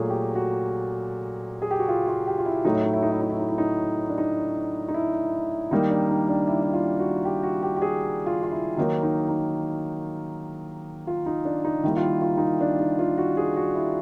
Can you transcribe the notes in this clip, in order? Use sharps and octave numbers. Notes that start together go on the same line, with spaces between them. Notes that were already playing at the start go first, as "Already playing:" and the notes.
Already playing: A#2 F#3 A3 F#4 G#4
G4
F#4
G#4
G4
F#4
F4
F4
G4
F4
E4
A2 F#3 A3 D#4
E4
D#4
E4
D#4
E4
D#4
E4
D#4
E4
D#4
D4
D#4
D#4
E4
D#3 G3 A#3 D#4
D4
D#4
D4
E4
E4
F4
F#4
G4
F#4
G4
G4
G#4
F4
F4
E4
D#3 F#3 A#3 D#4
D#4
D#4
F4
D#4
D4
D#4
D#3 G3 A#3 E4
F4
E4
F4
D#4
E4
D4
D#4
F4
F#4
G#4
F#4
E4